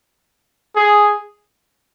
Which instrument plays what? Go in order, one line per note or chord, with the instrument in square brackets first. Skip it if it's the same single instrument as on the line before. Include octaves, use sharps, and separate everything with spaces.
[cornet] G#4